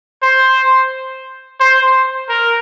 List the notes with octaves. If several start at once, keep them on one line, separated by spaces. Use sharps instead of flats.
C5
C5
A#4